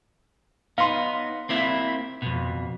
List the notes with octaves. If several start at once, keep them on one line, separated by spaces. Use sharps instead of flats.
B3 D#4 F5 C6
A#3 C4 E4
F2 B2